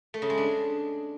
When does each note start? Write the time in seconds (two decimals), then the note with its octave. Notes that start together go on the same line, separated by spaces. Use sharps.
0.14 A3
0.22 C#3
0.30 G#3
0.38 D4